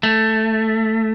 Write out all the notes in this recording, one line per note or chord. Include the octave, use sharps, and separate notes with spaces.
A3